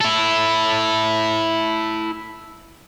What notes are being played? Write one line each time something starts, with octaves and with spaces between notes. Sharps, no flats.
E4 A4